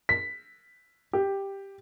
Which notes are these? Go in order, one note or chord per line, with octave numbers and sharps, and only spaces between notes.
B6
G4